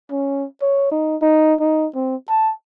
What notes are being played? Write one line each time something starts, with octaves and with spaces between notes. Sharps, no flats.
C#4
C#5
D#4
D#4
D#4
C4
A5